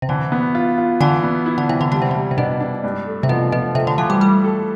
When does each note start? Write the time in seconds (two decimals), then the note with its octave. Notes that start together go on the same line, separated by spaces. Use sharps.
0.02 C3
0.09 D3 E3
0.32 B3
0.55 F4
0.78 F4
1.00 D3 E3
1.23 B3
1.46 E4
1.58 D3
1.69 C3 E3
1.81 D3
1.92 D3 G3
2.02 C3
2.11 D3
2.15 G3
2.31 C3
2.38 B2 D4
2.60 D4
2.84 G2
3.06 A3
3.23 C3
3.29 B2 F3
3.52 B2 F3
3.75 C3 A3
3.87 D3
3.98 E3 F3
4.10 G3
4.21 G3 A3
4.44 A4